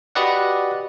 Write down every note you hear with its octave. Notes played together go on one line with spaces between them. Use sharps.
F#4 G4 B4 D5 D#5 F#5